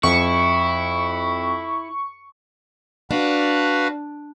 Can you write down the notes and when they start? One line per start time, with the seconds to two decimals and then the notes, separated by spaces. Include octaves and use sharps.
0.03 F2 E4 C#6
3.11 D4 F#4 B4 F5